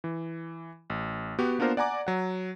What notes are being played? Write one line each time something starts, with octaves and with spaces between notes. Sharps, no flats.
E3
A1
B3 F#4 G4
A#3 B3 D4 F4 A#4 C5
D5 F#5 G#5 A#5 D6
F#3 F#5